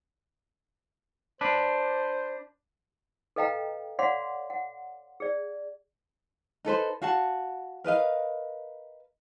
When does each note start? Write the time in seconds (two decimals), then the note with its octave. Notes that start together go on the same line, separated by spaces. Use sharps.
1.41 D4 B4 C5
3.36 A4 B4 D#5 F5 G5 A#5
3.99 C#5 D5 F5 F#5 C6 D6
4.50 F#5
5.20 G#4 D5
6.65 D#4 A4 B4 C5
7.02 F#4 F5 F#5 A5
7.84 A#4 B4 D#5 F5